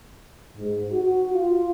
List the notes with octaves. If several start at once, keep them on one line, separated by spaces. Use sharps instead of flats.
G#2
F#4
F4